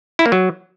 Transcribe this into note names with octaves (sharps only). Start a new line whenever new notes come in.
E4
A#3
F#3